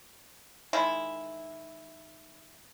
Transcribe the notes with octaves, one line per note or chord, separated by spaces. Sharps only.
D#3 G#3 E4